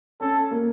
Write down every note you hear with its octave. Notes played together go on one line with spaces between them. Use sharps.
C#4 A4
A#3